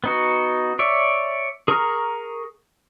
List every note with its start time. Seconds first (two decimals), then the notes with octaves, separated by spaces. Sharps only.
0.04 B3 D#4 F#4
0.79 C#5 D5 E5
1.68 G#4 A#4 A#5 C#6 F6